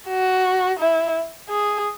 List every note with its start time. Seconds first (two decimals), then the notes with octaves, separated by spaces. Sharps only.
0.08 F#4
0.79 E4
1.49 G#4